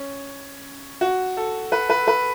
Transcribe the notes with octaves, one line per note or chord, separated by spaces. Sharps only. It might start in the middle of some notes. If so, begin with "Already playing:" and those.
Already playing: C#4
F#4
A4
B4
B4
B4